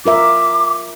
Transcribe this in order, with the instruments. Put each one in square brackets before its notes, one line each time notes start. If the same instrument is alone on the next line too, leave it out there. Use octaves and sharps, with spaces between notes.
[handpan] F4 A#4 E5 [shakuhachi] D6